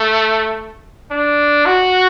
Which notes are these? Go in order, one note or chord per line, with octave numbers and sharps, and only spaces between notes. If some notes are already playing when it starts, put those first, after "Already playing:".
Already playing: A3
D4
F#4